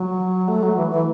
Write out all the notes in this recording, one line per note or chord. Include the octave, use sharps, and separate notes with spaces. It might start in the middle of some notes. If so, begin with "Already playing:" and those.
Already playing: F#3
A3
F#3
E3
E3